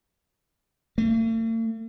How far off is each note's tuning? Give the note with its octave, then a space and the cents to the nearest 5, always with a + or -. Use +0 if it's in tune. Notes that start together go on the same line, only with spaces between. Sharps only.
A3 +45